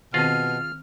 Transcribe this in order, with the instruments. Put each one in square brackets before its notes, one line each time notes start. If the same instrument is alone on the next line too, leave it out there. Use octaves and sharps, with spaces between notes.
[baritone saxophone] B2 [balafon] D#3 C4 [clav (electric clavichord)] F4 G#4 D#5 [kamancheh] F6